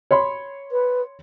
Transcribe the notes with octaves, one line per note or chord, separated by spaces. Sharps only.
C#5 B5 C6
B4